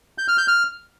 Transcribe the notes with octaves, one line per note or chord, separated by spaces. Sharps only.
G6
F6
G6
F6